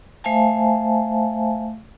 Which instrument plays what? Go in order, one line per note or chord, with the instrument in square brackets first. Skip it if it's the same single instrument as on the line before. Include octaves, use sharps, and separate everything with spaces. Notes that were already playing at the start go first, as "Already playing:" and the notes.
[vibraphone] A3 C5 E5 F5 G#5 A5